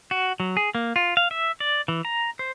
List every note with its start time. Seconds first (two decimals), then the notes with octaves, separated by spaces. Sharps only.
0.11 F#4
0.40 F#3
0.57 G#4
0.75 A#3
0.96 F4
1.17 F5
1.31 E5
1.60 D5
1.88 E3
2.05 A#5
2.39 C5